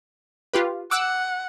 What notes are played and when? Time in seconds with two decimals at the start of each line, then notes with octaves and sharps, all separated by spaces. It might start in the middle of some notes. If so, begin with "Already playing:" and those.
0.53 F4 G4 B4
0.91 F#5 D6 E6 F#6